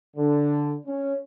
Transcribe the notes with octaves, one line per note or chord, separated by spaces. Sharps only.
D3
C#4